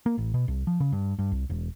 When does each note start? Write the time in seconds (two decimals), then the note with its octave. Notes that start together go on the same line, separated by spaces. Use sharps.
0.06 A#3
0.18 A1
0.34 B2
0.48 C2
0.67 F3
0.80 C#3
0.92 G2
1.19 G2
1.32 C2
1.50 E1